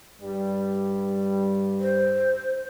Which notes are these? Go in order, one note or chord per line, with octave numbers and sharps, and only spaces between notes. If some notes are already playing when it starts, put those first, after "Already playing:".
G2 G3
C5